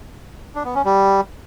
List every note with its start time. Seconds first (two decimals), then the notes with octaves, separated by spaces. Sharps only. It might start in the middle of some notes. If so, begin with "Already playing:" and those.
0.55 D4
0.65 B3
0.75 C#4
0.85 G3